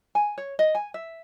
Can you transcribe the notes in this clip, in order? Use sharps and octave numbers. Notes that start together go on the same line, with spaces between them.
G#5
C#5
D#5
G#5
E5